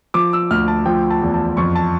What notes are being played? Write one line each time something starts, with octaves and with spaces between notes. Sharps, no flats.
F3 D6
E6
D2 F6
A5
F3 G5
A5
E2
A5
F2 C#6
A5